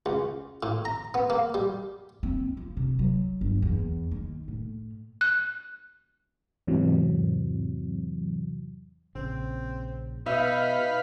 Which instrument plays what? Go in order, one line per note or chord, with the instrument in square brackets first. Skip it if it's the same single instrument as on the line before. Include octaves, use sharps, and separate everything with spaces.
[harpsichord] C#2
A2
A#5
B3
A#3
G3
[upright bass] C4
F3
C3
F#3
G1
E2
D#3
A2
[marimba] F#6
[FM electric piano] E2 G#2 C3 E3 F#3
[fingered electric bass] A#1 C#3 [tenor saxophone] C4
[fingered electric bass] B2 [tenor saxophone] D#4 [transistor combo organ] B4 F5 [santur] E5